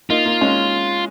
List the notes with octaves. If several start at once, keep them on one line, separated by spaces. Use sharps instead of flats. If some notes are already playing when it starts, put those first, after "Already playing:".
A#3 D#4 F4
A#3
G#3 C#4